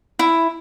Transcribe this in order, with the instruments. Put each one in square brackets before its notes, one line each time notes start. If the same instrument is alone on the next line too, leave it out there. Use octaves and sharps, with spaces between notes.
[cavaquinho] E4